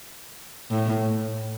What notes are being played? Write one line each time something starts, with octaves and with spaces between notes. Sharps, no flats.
A2